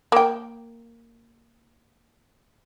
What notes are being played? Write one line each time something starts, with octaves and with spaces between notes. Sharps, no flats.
A#3 G5